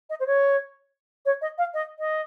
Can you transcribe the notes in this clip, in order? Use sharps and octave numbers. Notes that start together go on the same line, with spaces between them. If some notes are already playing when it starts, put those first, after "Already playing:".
D#5
C5
C#5
C#5
D#5
F5
D#5
D#5